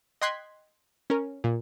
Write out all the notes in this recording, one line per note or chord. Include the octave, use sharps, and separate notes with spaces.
D#5 G5 C6 F#6 G#6 B6
C#4 A#4
A#2